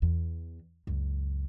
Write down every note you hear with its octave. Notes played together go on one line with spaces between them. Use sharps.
E2
C#2 F#2